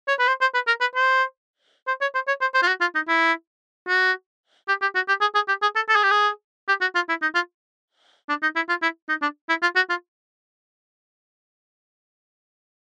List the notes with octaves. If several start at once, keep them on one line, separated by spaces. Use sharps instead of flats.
C#5
B4
C5
C5
B4
A#4
B4
C5
C5
C#5
C5
C#5
C5
C5
F4
F#4
F4
D#4
E4
F#4
G4
G4
F#4
G4
G#4
G#4
G4
G#4
A4
A4
G#4
G4
G#4
G4
F#4
F4
E4
D#4
F4
D4
D#4
E4
F4
E4
D#4
D4
E4
F4
F#4
F4